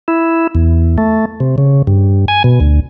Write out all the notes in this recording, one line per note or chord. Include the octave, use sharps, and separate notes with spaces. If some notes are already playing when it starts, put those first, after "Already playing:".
E4
E2
A3
C3
C#3
G2
G#5
B2
D2